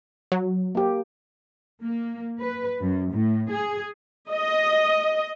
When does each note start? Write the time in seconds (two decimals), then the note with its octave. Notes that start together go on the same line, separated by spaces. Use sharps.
0.32 F#3
0.75 A#3 G4
1.82 A#3
2.40 B4
2.81 F#2
3.12 A2
3.51 G#4
4.31 D#5